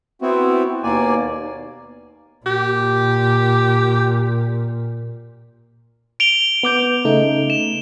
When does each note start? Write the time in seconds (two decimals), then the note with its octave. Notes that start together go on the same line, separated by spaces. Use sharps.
0.22 B3 C4 E4 F#4
0.83 D#2 B2 A#3 D5 G#5
2.46 A#2 G4
6.20 D7 F7 G7
6.63 B3 D6 G6
7.05 C#3 A3 D#4
7.50 E7